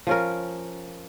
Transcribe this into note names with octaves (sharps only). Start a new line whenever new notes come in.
F3 C#4 A#4